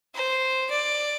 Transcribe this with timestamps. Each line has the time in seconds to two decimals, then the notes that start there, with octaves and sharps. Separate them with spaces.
0.15 C5
0.70 D5